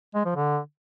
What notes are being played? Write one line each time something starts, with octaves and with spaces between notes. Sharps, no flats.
G#3
F3
D3